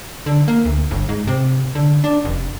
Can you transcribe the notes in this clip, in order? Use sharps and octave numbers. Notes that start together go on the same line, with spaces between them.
D3
A#3
D2
G1
G#2
C3
D3
D4
F1